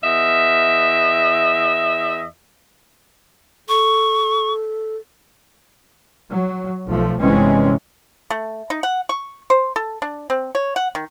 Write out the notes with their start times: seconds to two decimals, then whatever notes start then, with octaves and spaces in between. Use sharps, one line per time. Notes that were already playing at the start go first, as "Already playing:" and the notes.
0.04 E2 D#5 E5
3.69 A4 C#6
6.30 F#3
6.86 B1 F3 A3
7.20 G1 C3 E3 G#3 C4 C#4
8.30 A3
8.70 D#4
8.83 F#5
9.09 C#6
9.50 C5
9.76 A4
10.02 D4
10.30 C4
10.55 C#5
10.76 F#5
10.95 D#3